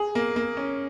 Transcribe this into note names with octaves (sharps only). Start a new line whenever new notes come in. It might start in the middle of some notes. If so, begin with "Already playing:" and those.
Already playing: G#4
A#3
A#3
C#4